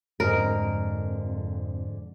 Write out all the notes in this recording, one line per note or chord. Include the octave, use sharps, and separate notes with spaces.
F2 G#2 D3 A#4 D#5